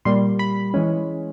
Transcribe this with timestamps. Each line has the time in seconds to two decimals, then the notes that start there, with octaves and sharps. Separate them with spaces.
0.05 A#2 G3 A#3 C6
0.39 B5
0.74 E3 G#3 C#4